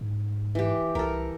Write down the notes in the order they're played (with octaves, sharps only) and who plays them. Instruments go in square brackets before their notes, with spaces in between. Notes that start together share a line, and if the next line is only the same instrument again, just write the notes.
[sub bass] G#2
[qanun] E3 G4
[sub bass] C2 [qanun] A4 A#4